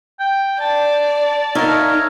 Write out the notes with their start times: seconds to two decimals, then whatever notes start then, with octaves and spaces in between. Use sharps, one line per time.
0.19 G5
0.60 D5 A5
1.55 D#4 A#4 C#5 E5 F5